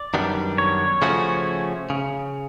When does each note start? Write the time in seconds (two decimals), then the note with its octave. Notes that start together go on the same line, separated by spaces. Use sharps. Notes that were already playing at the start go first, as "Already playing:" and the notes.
Already playing: D5
0.14 F#2 D#3 G3 B3 D4
0.58 C#5
1.02 C#3 F3 A3 C#4 F#4
1.90 C#3